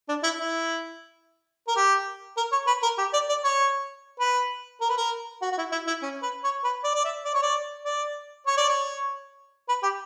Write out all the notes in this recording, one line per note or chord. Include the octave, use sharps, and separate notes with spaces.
D4
E4
E4
A#4
G4
A#4
C#5
B4
A#4
G4
D5
D5
C#5
B4
A#4
B4
A#4
F#4
F#4
E4
E4
E4
C#4
B4
C#5
B4
D5
D5
E5
D5
C#5
D5
D5
C#5
D5
C#5
B4
G4